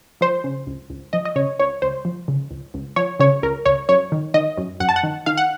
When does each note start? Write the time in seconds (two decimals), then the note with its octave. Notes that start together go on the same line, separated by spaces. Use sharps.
0.21 F3 C5
0.44 C#3
0.67 C#2
0.90 C#2
1.13 F3 D#5
1.25 D#5
1.36 C#3 C#5
1.60 C#2 C#5
1.82 C#2 C5
2.05 F3
2.28 C#3
2.51 C#2
2.74 C#2
2.96 F3 C#5
3.20 C#3 C#5
3.43 C#2 A#4
3.65 C#2 C#5
3.89 F#2 C#5
4.12 D#3
4.34 D#3 D#5
4.58 F#2
4.80 F#2 F#5
4.89 A5
4.96 F#5
5.03 D#3
5.26 D#3 F5
5.37 F#5